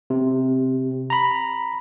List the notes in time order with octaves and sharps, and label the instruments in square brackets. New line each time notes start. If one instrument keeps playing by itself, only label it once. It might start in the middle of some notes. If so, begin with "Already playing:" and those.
[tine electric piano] C3
A#5 B5